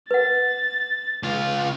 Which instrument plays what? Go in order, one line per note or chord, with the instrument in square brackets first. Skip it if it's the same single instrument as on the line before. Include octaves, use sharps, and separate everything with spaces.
[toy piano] B4 F#5 [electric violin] A6
[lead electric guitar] C#2 F4